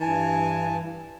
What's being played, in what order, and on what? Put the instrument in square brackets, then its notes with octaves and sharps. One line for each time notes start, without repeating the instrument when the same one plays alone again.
[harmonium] G2 G#5 A5 [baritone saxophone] E3